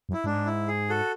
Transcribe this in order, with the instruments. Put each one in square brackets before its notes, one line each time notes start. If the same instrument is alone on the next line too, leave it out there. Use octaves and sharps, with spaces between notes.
[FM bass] F#2
[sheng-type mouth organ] E4
[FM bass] G#2 [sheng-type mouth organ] D4
[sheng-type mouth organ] E4
G#4
F#4 A4